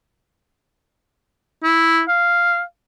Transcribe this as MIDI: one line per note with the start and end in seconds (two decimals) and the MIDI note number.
1.64 2.02 64
2.09 2.61 77